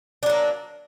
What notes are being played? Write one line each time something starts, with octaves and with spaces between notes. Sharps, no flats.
F#3 A#3 D4